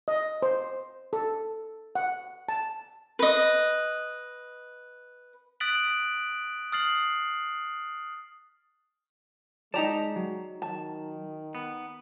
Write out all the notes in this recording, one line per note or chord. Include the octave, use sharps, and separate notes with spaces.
D#5
C5
A4
F#5
A5
B4 D#5
D#6 F#6 A6 B6 D7 F#7
D#6 F6 A6 C7 F#7
G#3 D#4 G4 D5 A5 A#5
F#3
D#3 A5
B3